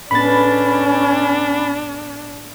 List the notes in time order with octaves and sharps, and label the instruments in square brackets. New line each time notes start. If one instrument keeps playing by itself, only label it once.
[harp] A2 G#3 B3 [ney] C#4 [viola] D4 [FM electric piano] B5 A6